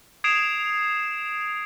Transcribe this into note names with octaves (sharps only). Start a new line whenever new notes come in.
D#6 G#6 C7 D7 E7 F7